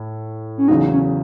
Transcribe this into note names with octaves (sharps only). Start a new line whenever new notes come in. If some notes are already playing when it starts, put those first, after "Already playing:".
Already playing: A2
C#4
E2 C#3 F#3 D#4
C#4